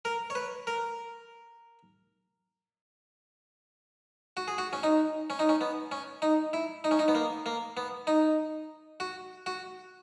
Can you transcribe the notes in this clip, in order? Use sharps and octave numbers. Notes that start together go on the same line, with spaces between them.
A#4
C#5
B4
A#4
F#4
G#4
F#4
C#4
D#4
C#4
D#4
C#4
B3
C#4
D#4
E4
D#4
C#4
D#4
B3
A#3
A#3
B3
D#4
F#4
F#4